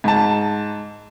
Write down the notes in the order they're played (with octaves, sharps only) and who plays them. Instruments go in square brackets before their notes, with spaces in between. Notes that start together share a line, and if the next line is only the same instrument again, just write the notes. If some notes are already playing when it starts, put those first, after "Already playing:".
[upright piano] G#2 A5